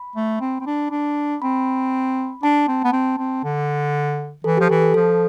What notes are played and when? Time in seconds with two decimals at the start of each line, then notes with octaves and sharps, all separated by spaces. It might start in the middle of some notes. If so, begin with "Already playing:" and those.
Already playing: B5
0.16 A3
0.41 C4
0.61 C4
0.66 D4
0.91 D4
1.42 C4 B5
2.43 D4 A5
2.68 C4
2.84 B3
2.93 C4
3.18 C4
3.44 D3
4.44 E3 A4
4.57 F3 G4
4.69 E3 A4
4.82 A4
4.94 F3 A4